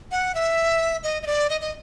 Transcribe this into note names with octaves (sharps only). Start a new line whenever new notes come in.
F#5
E5
D#5
D#5
D5
D#5
D#5